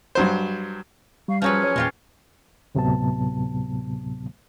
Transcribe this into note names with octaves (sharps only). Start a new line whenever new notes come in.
G2 F#3 C5
G3 F5 C#6
F3 F#3 C#4 G#4 B4 F6
C#5
E2 A#2 G#3 F4 G4
D2 A2 C3 F#3 B3 A5